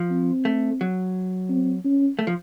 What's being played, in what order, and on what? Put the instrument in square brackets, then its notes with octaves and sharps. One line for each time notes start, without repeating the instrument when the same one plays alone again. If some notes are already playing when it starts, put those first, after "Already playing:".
Already playing: [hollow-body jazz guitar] F3
[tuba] C4
[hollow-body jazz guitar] A3
F#3
[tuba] C4
C#4
[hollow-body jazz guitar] A3
F3